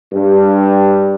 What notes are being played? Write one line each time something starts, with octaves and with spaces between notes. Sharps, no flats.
G2